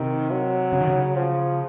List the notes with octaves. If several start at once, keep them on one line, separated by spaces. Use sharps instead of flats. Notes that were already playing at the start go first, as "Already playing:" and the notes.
Already playing: C3 D#3
F#3
C#3
D#3
C#3
F3